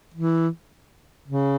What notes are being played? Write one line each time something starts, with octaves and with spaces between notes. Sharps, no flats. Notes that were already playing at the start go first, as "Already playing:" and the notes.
E3
C#3